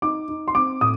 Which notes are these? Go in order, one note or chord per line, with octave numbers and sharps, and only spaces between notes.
D#4 D6
D#4
C6
C4 D6
A2 D#6